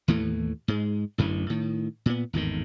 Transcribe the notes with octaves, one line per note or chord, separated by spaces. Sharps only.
D#2 A2 E3 A3
G#2 G#3
A1 F#2 D3 E3
A2 D#3
A#2 B3
G#1 E2 A2 D#3